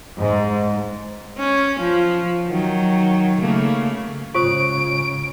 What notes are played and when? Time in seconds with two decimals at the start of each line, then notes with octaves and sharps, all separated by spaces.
0.19 G#2
1.38 C#4
1.80 F3
2.48 D#3 F#3
3.39 C#3 A3 A#3
4.35 G#2 C#3 F4 C5 C#6 D#6 D7